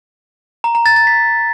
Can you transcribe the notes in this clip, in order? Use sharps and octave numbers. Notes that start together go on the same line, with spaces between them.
A#5
A#5
A6
A6
B6